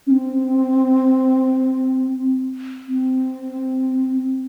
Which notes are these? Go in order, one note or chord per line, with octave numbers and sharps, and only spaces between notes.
C#4
C4
C4